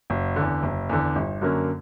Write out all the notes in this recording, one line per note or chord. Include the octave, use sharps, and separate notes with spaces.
F#1
E2 D3
F#1
E2 D3
G1
F#2 D3 A#3 C#4